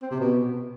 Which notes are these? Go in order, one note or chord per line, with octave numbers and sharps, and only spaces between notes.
C4
C3
B2